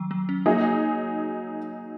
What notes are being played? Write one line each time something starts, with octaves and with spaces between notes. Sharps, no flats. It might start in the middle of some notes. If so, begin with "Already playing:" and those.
Already playing: D#3 F#3
F#3
C#4
F#3 A#3 D#4 G#4